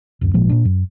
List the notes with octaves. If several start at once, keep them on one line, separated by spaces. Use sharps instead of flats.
D1 F#2
G#1 A#2 F3 G#3
A#2 D4
F#2